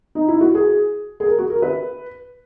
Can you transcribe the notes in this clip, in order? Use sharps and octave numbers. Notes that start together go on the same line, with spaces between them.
D#4
E4
F#4
G#4
G#4
A#4
F#4
A#4
B4